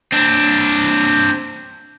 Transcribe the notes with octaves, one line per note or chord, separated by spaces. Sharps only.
C4 D4